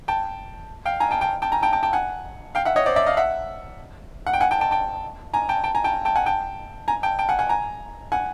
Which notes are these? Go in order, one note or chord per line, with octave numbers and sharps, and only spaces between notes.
G5 A5
F5 G5
G#5 A#5
G5 A5
G5 A5
G5 A5
G#5 A#5
G5 A5
G5 A5
G5 A5
F#5 G#5
F5 G5
E5 F#5
C#5 D#5
C5 D5
D5 E5
D#5 F5
E5 F#5
F#5
G5
F#5 G#5
G5 A5
G5 A5
G5 A5
G#5 A#5
G5 A5
G5 A5
G#5 A#5
G5 A5
G5 A5
F#5 G#5
G5 A5
G#5 A#5
G5 A5
G5 A5
F#5 G#5
F#5 G#5
G#5 A#5
F#5 G#5